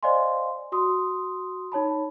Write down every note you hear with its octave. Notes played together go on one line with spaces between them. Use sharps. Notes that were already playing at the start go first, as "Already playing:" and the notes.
C5 D5 D#5 F5 G#5 C6
F#4 C6 D#6
D#4 C#5 A5 B5